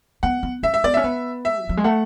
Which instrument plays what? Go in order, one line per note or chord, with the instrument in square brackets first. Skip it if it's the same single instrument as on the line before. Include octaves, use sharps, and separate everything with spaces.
[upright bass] B3 [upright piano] F#5
[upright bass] B3
[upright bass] C#4 [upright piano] E5
[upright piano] E5
[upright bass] B3 [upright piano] D5
[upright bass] C#4 [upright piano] E5
[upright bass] B3
[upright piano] E5
[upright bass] E3
F#3
G#3
[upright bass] A3 [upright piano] F#5